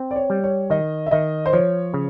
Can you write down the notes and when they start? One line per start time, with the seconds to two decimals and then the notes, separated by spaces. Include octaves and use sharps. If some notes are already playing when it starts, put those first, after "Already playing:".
Already playing: C4
0.11 D5
0.16 C#5
0.30 G3
0.44 C#5
0.70 D#3 D#5
1.06 E5
1.11 D#3 D#5
1.46 C5
1.53 F3 C#5
1.94 C#3